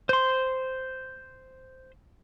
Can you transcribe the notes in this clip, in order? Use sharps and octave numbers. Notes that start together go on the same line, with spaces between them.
C5 C6